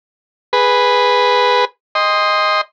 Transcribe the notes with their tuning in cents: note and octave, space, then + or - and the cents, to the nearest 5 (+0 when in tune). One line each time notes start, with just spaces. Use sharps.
G#4 -5 B4 +0
D#5 +0 G5 +35 C6 +0